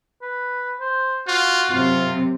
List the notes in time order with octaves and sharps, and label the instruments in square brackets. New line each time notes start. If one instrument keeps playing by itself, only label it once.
[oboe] B4
C5
[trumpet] F4 [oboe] F#4
[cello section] F#2 C3 [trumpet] F4